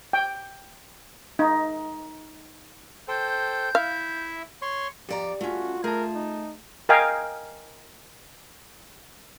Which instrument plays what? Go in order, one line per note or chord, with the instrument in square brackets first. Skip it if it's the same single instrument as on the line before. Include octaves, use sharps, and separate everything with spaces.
[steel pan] G5
D#4
[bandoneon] A4 C5 G5 [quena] G6
[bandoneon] E4 E5 [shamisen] F5
[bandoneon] C#5 C6 C#6
[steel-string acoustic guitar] F2 D5 A#5 [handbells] G4
[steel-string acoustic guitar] A3 C#4 [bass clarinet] F4 [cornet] F#4
[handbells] A3 A5 [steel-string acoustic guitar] G#4 [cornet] A#4
[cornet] D#4
[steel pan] A#4 D#5 F5 G5 G#5